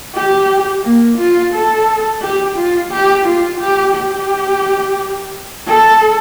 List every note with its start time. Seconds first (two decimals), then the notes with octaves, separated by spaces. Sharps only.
0.15 G4
0.84 A#3
1.18 F4
1.54 A4
2.22 G4
2.57 F4
2.91 G4
3.26 F4
3.60 G4
3.95 G4
5.67 A4